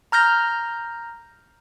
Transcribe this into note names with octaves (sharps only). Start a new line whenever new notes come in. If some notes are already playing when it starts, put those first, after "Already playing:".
A#5 F6 G6 A#6